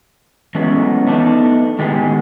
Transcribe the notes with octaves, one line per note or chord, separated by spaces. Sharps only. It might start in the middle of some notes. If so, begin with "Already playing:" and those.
E3 F#3 G#3 A3 B3 C#4
A3 B3 D4 D#4
A2 D#3 G#3 B3 G4 G#4